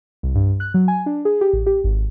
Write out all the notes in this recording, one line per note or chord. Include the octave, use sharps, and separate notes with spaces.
C2
G2
F#6
F#3
G#5
D4
G#4
G4
A1
G4
G#1